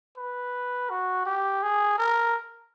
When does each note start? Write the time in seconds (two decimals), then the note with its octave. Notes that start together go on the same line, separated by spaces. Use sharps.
0.17 B4
0.90 F#4
1.26 G4
1.63 G#4
1.98 A#4